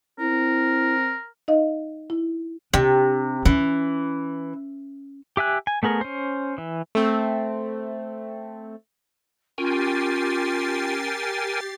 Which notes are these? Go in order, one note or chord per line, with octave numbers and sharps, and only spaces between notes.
C4 E4 A#4
D#4 D#5 F5
E4
C3 D4
E3 C#4
G4 E5 G#5 F#6
G#5
A3 B3 G#4 A#4
C#4 C5
E3
A3 C4
C#4 F4 G4 A#4 G5 G#5 A6 C7